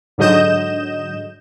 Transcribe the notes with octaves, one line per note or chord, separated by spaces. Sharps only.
G#2 D3 F#3 D#5 G6 E7